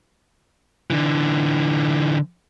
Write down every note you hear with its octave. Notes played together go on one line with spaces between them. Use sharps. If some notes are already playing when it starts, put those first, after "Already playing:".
D3 E3